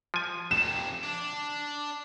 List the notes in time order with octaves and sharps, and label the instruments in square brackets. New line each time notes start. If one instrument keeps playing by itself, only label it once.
[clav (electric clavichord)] F3 G#5
[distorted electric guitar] F2 C3 [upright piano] E7
[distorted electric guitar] D4